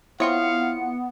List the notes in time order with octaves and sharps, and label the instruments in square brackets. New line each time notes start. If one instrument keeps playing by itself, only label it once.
[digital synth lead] B3 [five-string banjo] C4 F4 C#5 [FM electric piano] E4 C#7 [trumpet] F5